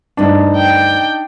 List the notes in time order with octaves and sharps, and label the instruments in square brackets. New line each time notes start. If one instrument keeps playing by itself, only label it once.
[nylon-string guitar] D2 G2 [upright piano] D4 D#4
[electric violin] G5